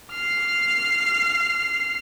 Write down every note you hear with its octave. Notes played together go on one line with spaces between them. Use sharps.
F6 C7